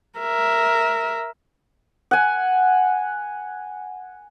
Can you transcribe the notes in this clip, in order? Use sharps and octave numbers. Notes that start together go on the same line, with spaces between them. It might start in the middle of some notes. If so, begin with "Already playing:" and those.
A#4 E5
F#5 G#5